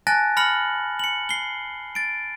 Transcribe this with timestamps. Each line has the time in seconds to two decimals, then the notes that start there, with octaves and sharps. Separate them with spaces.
0.07 G#5 A5 F#6 A6 A#6
0.37 B5 F6 A#6 C#7 F#7
0.99 C#7 F#7
1.29 C7 G7
1.95 A6 D7